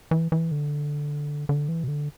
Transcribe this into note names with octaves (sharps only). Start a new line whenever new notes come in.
E3
E3
D3
D3
E3
B2
D3